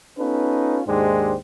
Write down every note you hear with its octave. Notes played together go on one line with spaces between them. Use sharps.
B3 C#4 D#4 F4 A4 B4
D#2 G#2 G#3 D4 G4 C5